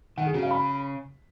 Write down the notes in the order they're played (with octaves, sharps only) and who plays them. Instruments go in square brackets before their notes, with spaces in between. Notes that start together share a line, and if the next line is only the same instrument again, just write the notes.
[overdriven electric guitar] D#3 [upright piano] F#5
[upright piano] G#4
[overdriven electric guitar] C#3 [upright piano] F#4
[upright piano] F5
B5